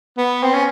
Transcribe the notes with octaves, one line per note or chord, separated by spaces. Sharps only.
B3
C4
C#4